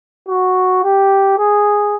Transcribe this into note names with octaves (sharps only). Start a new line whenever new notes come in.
F#4
G4
G#4